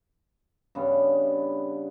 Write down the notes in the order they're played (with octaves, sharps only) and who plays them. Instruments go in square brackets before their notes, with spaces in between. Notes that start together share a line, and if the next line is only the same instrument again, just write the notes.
[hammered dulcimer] G2 C#3 B3